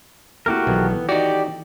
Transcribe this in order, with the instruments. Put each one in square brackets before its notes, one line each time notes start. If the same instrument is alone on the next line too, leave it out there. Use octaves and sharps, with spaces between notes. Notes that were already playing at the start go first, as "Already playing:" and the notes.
[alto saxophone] A3 [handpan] A#3 C4 E4 [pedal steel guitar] F#4 G4 A#4
[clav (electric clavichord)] B1 [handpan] D#3 E3 A4 [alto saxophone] B3
[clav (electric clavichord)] D#4 F#4 [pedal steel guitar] G4 [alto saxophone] D5